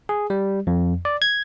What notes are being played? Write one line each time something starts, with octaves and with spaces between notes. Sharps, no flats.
G#4
G3
F2
D5
G#6